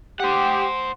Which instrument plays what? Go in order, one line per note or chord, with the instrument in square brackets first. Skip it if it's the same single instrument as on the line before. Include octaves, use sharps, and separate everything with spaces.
[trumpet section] G4 [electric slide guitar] C5 F#5